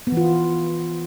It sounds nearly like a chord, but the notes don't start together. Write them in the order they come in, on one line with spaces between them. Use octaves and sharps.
B3 E3 F4